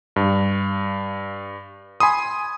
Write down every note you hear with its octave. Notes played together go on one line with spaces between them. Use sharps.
G2
G#5 B5 C6 D#6